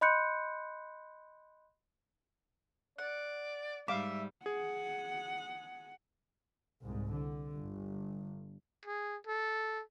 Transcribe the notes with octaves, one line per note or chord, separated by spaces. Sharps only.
D#5 B5 C6 F#6 G6 C#7
D5 F#5
G#2 G3 E5 F5 D6
G#4 F#5
C2 G#2
D3
G1
G#4
A4